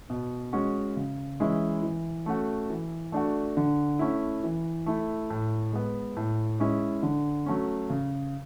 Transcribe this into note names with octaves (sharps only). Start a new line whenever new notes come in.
B2
G#3 C#4 F#4
C#3
E3 G#3 C#4 E4
E3
A3 C#4 F#4
E3
A3 D4 F#4
D3
A3 C#4 E4
E3
A3 E4
A2
G#3 B3
A2
G#3 C#4 E4
D3
F#3 A3 C#4
C#3